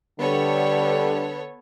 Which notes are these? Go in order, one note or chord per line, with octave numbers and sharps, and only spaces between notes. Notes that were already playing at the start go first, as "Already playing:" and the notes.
D3 G3 B3 A4 C#5